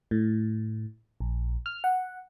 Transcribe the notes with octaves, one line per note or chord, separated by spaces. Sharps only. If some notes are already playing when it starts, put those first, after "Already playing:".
A2
A#1
F6
F#5